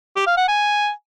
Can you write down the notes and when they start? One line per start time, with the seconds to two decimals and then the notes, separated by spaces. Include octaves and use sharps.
0.16 G4
0.27 F5
0.37 F#5
0.48 G#5